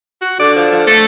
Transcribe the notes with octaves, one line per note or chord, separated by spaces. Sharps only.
F#4
D3 D5
F3
F3
A3 A4